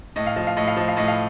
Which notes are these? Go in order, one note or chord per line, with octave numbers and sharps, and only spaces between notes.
A2 D#5
F5
F3 D#5
F5
A2 D#5
F5
F3 D#5
F5
A2 D#5
F5